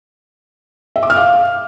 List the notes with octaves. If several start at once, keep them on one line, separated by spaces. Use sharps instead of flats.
E5
D6
F6
F5